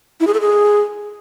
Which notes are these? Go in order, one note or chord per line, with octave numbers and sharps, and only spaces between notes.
E4
G#4
A4
G#4